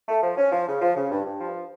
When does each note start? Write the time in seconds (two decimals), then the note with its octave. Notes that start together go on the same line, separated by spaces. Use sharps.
0.09 A3
0.23 F3
0.38 C#4
0.52 F3
0.67 C#3
0.81 F3
0.96 C#3
1.11 G2
1.25 G2
1.40 F3